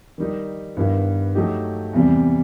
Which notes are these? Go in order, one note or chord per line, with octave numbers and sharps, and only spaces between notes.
D#3 G3 D#4
G2 D#3 G3 B3 E4
F#3 A3 D#4 G4
E2 C3 E3 G3